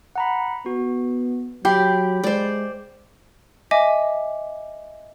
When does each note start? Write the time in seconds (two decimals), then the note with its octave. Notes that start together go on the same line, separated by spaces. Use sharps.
0.16 F#5 A#5 B5
0.66 B3 F#4
1.65 F#3 G4 G5 B5 C6 G6
2.24 G#3 C5 D5
3.71 D#5 E5 G#5 D6